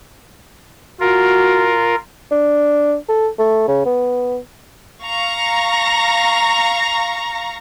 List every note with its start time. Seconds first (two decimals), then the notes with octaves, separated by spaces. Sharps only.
1.00 F4 F#4 A#4
2.31 D4
3.09 A4
3.39 A3
3.68 C#3
3.86 B3
5.03 F5 A#5 C#6 A#6